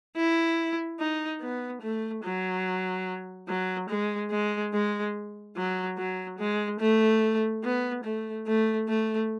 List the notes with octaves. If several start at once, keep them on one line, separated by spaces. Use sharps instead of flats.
E4
D#4
B3
A3
F#3
F#3
G#3
G#3
G#3
F#3
F#3
G#3
A3
B3
A3
A3
A3